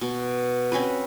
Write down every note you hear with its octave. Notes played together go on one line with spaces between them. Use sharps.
B2
C4 C#4 F#4 B4